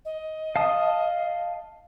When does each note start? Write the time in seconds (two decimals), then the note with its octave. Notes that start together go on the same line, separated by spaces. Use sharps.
0.05 D#5
0.56 F5 A5 D#6